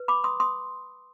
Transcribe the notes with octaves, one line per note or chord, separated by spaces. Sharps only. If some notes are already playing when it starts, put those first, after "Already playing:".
Already playing: B4
B5 D6
C6 D#6
C6 D#6